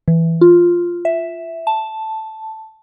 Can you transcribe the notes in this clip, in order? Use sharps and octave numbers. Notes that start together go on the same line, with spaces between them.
E3
F4
E5
A5